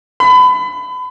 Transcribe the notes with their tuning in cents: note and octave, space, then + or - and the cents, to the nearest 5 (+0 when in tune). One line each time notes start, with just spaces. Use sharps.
B5 +30